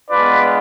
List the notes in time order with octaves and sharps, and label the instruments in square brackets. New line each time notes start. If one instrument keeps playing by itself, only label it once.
[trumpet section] G#3 B3 D4 F4 B4 D5